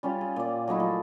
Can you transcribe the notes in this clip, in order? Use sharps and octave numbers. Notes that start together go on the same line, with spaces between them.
G3 C#4 F4 C#5
G#4
A#2 D5
F#3 A3 D#4 E4
F3